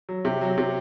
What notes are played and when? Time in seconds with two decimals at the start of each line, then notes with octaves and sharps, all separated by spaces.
0.09 F#3
0.25 C3
0.41 F#3
0.58 C3